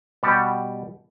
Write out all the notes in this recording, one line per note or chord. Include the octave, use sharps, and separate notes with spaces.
B2 G3 G4 F#5 A5